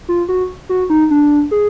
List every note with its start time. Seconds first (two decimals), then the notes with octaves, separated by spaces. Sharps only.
0.09 F4
0.29 F#4
0.69 F#4
0.90 D#4
1.11 D4
1.51 G#4